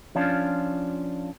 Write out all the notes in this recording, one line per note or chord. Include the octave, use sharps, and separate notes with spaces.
F3 C#4 D4 F4